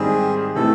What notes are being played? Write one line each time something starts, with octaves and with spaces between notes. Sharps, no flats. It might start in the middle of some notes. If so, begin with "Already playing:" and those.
Already playing: G#2 D#3 G3 C4 G#4
C3 E3 A3 A4